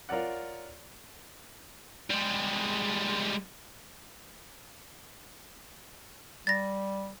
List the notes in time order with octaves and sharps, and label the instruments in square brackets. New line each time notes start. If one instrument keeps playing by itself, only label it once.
[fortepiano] F4 A#4 C#5 D5 F#5
[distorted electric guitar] G3 G#3
[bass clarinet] G3 [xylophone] A6 A#6